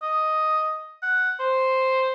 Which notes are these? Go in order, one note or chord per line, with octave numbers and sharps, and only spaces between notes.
D#5
F#5
C5